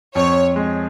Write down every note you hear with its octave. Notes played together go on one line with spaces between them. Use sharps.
F2 C#5
G#3